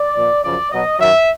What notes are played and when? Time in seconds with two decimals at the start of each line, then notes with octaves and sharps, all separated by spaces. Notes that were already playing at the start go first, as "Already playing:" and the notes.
Already playing: D5
0.15 A#2 F3
0.44 F#2 C#3 F3 D5
0.71 B2 F#3 D#5
1.00 F#2 D#3 F#3 E5